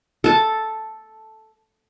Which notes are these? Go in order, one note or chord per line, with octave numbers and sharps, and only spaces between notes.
A4 A5